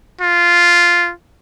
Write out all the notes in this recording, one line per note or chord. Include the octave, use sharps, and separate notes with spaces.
F4